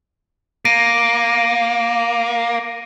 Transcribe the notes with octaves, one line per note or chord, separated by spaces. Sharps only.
A#3 A#6 D7 D#7